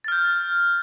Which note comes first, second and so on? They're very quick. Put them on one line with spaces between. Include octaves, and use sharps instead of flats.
A6 F6 G6